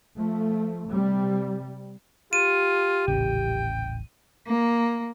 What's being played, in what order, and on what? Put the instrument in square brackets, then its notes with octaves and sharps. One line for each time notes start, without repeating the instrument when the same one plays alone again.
[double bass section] F3 A3
C3 G3
[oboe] F4 [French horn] G4 [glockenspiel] D#7
[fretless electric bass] D#1 A1 C#3 [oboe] G5
[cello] A#3